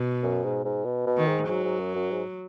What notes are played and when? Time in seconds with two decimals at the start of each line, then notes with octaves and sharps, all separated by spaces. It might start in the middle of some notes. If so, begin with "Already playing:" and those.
Already playing: B2
0.23 F#2
0.44 G#2
0.65 G#2
0.85 B2
1.06 B2
1.17 D#3
1.28 G#2
1.48 G#2 F#3
1.64 G#2
1.79 F#2
1.95 F#2
2.11 G#2